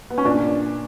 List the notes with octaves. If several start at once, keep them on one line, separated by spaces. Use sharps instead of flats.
B3
C#4
A#2 D4